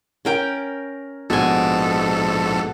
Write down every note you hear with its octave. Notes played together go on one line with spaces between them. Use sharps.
C#4 A#4 G5
A#1 G#2 B2 A4 G#5